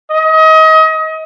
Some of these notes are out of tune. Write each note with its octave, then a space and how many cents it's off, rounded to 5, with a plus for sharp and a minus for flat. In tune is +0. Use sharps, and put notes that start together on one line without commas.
D#5 +30